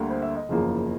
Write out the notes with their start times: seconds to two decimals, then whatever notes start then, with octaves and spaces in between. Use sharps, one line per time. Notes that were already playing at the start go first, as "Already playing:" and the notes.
Already playing: D2 D3 G3 A#3
0.10 C5
0.22 E5
0.36 D#5
0.49 F#1 E2 C#3 F3 A#3